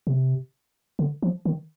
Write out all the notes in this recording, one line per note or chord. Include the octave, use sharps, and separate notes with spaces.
C3
D3
F3
D#3